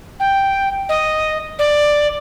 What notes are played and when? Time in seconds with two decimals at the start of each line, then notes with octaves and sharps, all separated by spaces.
0.20 G5
0.89 D#5
1.59 D5